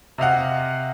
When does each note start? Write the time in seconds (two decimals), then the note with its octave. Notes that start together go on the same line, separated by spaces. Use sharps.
0.18 C3 D#5 F5 F#5